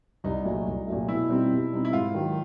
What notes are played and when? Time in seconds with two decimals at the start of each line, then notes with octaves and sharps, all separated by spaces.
0.24 C2 D#4
0.45 A#2 F#3 A3
0.66 C2
0.87 A#2 F#3 A3
1.08 B2 E4
1.29 G3 C4 D#4
1.51 B2
1.72 G3 C4 D#4
1.85 E4
1.92 G#2 F4
2.14 D#3 F#3